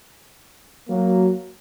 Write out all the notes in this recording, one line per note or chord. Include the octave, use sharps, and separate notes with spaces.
F#3 A#3